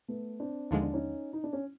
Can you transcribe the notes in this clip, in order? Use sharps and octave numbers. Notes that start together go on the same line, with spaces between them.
A3 B3
C4 D4
D#2 D3 F3 G#3 D#4
D4
C#4 D#4
D#4
D4
C#4